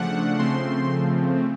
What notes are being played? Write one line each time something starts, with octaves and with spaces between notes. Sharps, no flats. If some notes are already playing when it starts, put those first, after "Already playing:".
Already playing: C#3 F3 A3 D4 F#5
C#3 F3 A3 C4 C6